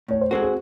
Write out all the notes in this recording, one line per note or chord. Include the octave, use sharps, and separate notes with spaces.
A2 C#5
C5
G#3 C4 F#4 A4
G#4